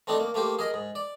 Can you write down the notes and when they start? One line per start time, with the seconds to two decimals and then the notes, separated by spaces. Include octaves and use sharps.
0.07 A3 C4 D4 D#4 A4
0.20 A#3
0.34 A3 A#3 G4 C5
0.59 G#4 A#4 D#5
0.74 G#2
0.95 D5